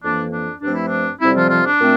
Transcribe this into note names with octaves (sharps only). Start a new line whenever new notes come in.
F2 E3 A#3 D4
D4
G2 F3 A3 C4 D4
E4
D4
F2 C3 G3 C4 E4
F3 F4
F3 F4
D4
A#2 A3 C4